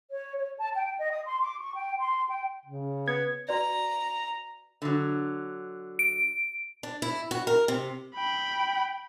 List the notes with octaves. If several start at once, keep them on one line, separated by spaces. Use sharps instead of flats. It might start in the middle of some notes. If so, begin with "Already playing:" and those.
C#5
C#5
A5
G5
D#5
D#6
C6
D6
C#6
G5
C6
G5
C#3
B3 G#6
F#4 B4 D5 A#5
D3 F#3
D7
D4
E4
F#4
A#4
C3
G5 B5